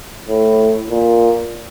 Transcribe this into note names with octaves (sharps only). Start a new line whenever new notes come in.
A2
A#2